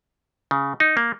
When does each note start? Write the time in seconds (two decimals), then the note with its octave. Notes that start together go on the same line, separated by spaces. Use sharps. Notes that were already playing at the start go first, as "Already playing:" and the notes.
0.51 C#3
0.80 D#4
0.97 A#3